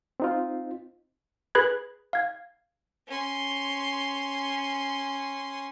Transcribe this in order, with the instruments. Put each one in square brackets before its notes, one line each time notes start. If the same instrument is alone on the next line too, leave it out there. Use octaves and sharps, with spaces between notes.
[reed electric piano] C4 D#4 F4
[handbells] G#4 B4 B5 F#6 G#6
F5 G#6
[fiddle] C#4 C6